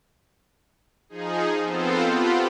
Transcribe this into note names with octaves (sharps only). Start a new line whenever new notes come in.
F3 D#4 G#4
B3 C4 F4 A4 C5
F4 G4 F#5 B5